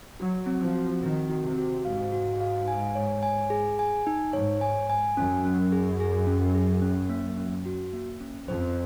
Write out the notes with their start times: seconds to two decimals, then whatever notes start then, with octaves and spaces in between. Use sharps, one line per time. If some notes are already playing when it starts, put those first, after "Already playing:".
0.20 F#3 F#4
0.46 C4
0.61 F3
0.75 F#4
1.02 D#3 C4
1.29 F#4
1.43 C3
1.58 F#4
1.85 G#2 F5
2.12 F#4
2.40 F5
2.68 G#5
2.95 C#5
3.23 G#5
3.50 G#4
3.79 G#5
4.07 D#4
4.33 G#2 C#5
4.61 G#5
4.90 G#5
5.17 F#2 C#4
5.45 C#4
5.72 G#4
6.00 G#4
6.27 C#4
6.54 G#4
6.82 C#4
7.10 A#3
7.37 C#4
7.66 F#4
7.93 A#3
8.21 C#4
8.48 F2 C5